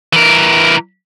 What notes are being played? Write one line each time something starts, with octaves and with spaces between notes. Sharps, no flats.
E3 A#4